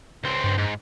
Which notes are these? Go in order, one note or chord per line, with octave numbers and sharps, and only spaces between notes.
C#2 C4
G2
G#2